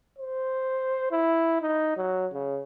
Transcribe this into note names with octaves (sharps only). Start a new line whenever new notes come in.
C5
E4
D#4
F#3
C#3